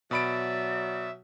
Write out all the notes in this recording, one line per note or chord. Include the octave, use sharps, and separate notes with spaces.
B2 F#3 D5 E5 B5 D7